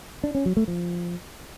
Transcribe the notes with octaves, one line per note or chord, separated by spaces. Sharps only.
D4
C#4
F#3
A3
F3